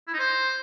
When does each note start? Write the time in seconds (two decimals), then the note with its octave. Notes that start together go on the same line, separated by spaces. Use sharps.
0.08 E4
0.14 D#4
0.20 C5